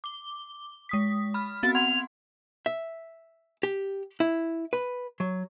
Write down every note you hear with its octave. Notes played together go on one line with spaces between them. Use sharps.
D6 G7
G#3 D#6 B6
B5 F6
B3 C4 F#4 A6
F#5 C6 G#6 F7
E5
G4
E4
B4
F#3